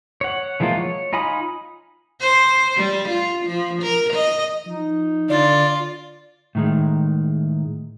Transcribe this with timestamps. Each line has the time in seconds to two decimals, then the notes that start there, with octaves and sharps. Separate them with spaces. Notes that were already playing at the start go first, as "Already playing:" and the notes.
0.21 C#5 F#5
0.60 E3 F3 G#3 A#3 F4
0.76 C#5
1.13 D#4 F4 G#5 B5 D#6
2.20 C5
2.77 G3
3.09 F4
3.46 F3
3.82 A#4
4.13 D#5
4.66 F3 D#4
5.30 D3 F4 D5
6.55 A2 D#3 G#3